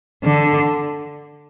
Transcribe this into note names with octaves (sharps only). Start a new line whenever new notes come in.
D3